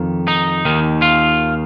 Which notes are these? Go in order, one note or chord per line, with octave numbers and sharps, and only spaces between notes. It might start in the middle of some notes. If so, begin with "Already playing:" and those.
Already playing: F2 D#3
D#4
D#2 D#3
F4